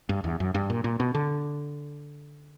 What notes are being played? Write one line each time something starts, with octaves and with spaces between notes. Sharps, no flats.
G2
E2
F#2
G2
A#2
A#2
B2
D3